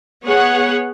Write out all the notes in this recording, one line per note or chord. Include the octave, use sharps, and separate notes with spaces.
B3 G#4 C#5 F#5